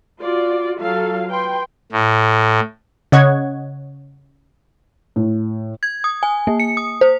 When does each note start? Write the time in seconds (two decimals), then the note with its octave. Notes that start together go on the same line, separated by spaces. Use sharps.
0.21 F4 F#4 D5
0.80 F#3 F4 A4 F5
1.30 B4 G5 C6
1.92 A2
3.12 C#3 C#5 D#5 F#5 G#6
5.16 A2
5.83 G#6
6.04 D#6
6.23 G#5
6.47 A#3
6.60 C#7
6.77 D#6
7.01 C5